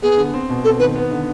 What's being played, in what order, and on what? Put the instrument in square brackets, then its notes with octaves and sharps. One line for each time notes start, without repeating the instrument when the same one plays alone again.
[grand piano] B3 [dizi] G#4
[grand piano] D3
C4
B2
[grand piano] C4 [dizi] A4
[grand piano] D#3 [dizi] B4
[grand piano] B3
D3